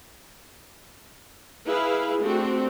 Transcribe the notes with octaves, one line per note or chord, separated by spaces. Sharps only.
E4 G#4 B4 F5
A3 C4 D4 F#4 G4